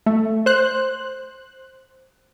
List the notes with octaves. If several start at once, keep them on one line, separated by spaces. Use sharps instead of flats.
A3
C5 F#6